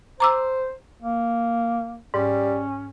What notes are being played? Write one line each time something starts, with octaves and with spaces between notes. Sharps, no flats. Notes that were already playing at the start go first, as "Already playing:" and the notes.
C5 A#5 D6 E6
A#3
G#2 G3 C#4